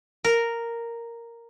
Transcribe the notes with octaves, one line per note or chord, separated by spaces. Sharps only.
A#4